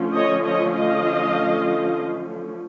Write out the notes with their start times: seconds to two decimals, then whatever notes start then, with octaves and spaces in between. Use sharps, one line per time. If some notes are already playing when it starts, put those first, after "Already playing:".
Already playing: D3 F3 A3 C#4
0.14 C#5 D#5
0.44 C#5 D#5
0.74 D#5 F5